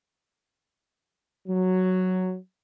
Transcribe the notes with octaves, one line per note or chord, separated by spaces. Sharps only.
F#3